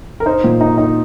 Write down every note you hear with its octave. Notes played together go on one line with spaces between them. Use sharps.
A#4
D#4 C5
A#2
D#4
D#4